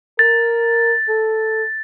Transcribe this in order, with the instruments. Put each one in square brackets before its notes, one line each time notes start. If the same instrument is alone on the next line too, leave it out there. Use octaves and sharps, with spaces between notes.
[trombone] A#4 [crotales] A6
[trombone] A4